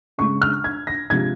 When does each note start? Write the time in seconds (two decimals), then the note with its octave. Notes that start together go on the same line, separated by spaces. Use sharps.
0.18 C#3 G#3 C#6
0.41 F6
0.64 G#6
0.87 A#6
1.10 C3 F3 G#3 G#6